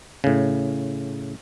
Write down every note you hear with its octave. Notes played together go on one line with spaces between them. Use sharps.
A2 C#3